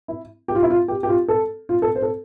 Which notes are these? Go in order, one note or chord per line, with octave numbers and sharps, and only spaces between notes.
E4
G4
F4
E4
F4
G4
G4
F4
A4
F4
A4
C5
A4